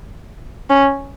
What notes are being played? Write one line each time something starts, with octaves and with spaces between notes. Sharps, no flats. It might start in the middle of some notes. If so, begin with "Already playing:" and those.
C#4